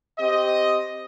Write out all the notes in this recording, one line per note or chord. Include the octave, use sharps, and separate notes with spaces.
C4 G4 D#5